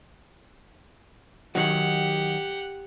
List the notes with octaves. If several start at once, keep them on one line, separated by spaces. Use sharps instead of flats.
D#3 F#3 G4 F#5